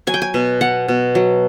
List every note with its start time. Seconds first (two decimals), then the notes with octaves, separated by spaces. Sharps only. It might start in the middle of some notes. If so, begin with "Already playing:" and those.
0.07 F#3 G#5
0.14 G5
0.22 G#5
0.34 B2
0.61 B3 F#5
0.88 B2
1.15 F#3